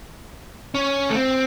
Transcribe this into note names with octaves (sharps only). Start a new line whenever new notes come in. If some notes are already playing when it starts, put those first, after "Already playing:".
C#4
A3
C4